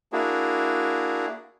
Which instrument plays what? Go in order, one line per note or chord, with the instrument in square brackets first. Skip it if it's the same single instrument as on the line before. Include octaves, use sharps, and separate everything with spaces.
[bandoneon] A#3 D4 E4 F#4 G#4